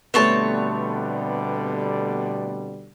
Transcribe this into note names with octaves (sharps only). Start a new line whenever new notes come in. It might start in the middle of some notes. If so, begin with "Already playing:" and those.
B2 D3 G3 A3 B3 C4 C#5 A5